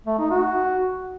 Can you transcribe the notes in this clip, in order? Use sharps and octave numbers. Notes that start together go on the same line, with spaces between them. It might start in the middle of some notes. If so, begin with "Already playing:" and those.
A3
D#4
F#4